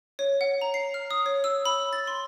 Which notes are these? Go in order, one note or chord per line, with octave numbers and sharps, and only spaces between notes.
C#5
F#5
A#5
C7
F6
D#6
C#5
E6
B5
A6
C6